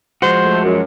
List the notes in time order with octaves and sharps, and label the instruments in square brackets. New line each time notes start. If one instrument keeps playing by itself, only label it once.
[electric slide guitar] F3 G#3 F#4 [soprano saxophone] C5
[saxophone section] A3
F#2